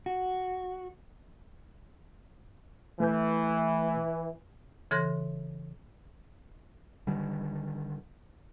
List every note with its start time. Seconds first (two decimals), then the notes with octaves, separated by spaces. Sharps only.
0.06 F#4
3.00 E3 A3 G6
4.91 C#3 E3 A4 C6 F#6 A#6
7.07 D3 D#3 G3